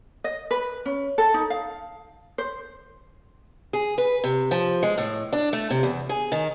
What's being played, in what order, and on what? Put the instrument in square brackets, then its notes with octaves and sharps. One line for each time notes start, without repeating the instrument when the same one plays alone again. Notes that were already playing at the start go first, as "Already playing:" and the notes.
[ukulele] D#5
B4
C#4
A4
D#4
F5
C5
[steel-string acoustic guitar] G#4
B4
C3
F3
G#3
A2
D4
A3
C3
E2
G#4
D#3